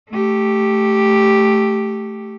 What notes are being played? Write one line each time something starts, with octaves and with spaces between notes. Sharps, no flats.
A3 G4